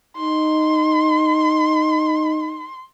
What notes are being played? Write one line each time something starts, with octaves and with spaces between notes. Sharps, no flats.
D#4 C6